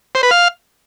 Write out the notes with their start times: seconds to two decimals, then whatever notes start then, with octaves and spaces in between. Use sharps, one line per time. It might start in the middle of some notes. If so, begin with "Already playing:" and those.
0.15 C5
0.23 B4
0.31 F5